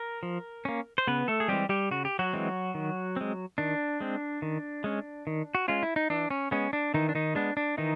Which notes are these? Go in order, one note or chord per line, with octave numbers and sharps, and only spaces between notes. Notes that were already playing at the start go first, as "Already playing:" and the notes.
Already playing: A#4
F3
A#3 C#4
C5
C#3 B3 B4
A3 A4
G#4
E3 G3 G#3 C4 G4
G3 G4
C#3 F#4
G4
F#3 F#4
E3 G#3 C4
D#3
G#3 C4
D#3 D4
G#3 C4
D#3
G#3 C#4
D#3
F#4
G#3 C#4 F4
E4
D#4
E3 D4
C#4
G#3 B3 C#4
D4
D#3 E3 D#4
D4
D#3 D#4
G#3 B3 D4
D4
D#3 E3 D#4